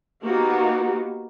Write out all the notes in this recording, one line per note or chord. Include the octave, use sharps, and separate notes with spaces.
A#3 B3 D#4 F#4 G4